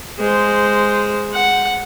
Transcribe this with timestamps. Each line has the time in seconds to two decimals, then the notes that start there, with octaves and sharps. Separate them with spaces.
0.19 G#3 C5
1.33 F#5